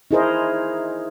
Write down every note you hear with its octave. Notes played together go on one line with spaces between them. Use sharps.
D#4 E4 G#4 A#4 C5 D#5